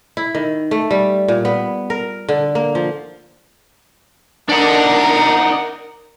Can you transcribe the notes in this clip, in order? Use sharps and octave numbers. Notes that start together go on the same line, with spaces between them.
E4
D#3
A3
G3
A#2
B3
A#4
D3
A#3
F3
D4 D#4 A#4 D5 F#5